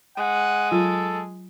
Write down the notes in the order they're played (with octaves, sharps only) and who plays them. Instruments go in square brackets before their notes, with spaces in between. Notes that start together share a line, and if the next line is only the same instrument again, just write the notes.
[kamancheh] G#3 [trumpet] F#5
[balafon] F#3 F4 [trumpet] A4